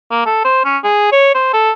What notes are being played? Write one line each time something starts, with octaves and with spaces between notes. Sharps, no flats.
A#3
A4
C5
C#4
G#4
C#5
C5
A4